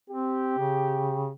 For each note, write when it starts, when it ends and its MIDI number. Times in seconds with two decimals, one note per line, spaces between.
0.10 0.57 60
0.10 1.31 67
0.59 1.32 49